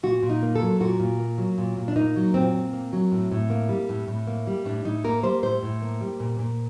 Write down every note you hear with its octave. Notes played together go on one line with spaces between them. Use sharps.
A#2 F#4
A#2
D#4
A#3
A4
F#3
A#2 F#4
A#2
A#3
F#3
A#2
A#2
D4
A#3 D#4
F#3
A#2 C4
A#2
A#3
F#3
A2
A2
A#3
G3
A2
A2
A#3
G3
A2 D4
A2 D#4
A#3 A#4
G3 C5
A2 C5
A2
A#3
G3
A#2
A#2